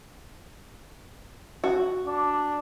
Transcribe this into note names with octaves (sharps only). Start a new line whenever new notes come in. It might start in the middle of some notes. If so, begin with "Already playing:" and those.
F#4
D4